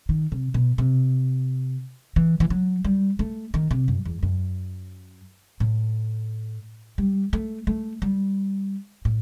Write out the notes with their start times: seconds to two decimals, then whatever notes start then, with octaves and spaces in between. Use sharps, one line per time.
0.09 D#3
0.32 C3
0.54 B2
0.78 C3
2.16 E3
2.40 E3
2.50 F#3
2.84 G3
3.19 A3
3.54 D#3
3.71 C3
3.88 F#2
4.05 E2
4.23 F#2
5.60 A2
6.98 G3
7.33 A3
7.67 A3
8.02 G3
9.05 A2